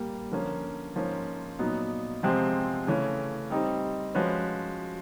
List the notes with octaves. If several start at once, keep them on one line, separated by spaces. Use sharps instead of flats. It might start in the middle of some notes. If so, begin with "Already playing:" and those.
Already playing: A#2 G3 A#3
D3 F3 A#3 C#4
G#2 F3 A#3 C#4
A#2 F#3 B3 D#4
E2 C3 F3 G#3 C4
C#3 E3 A3 C#4
G3 C4 D#4
F3 G#3 C#4 F#4 B4